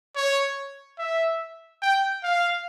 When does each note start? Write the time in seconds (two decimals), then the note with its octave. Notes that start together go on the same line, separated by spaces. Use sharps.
0.16 C#5
0.99 E5
1.82 G5
2.23 F5